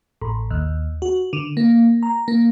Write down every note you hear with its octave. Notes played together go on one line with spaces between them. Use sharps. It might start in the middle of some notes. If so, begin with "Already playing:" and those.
A1
D#2
F#4
D3
A#3
A#5
A#3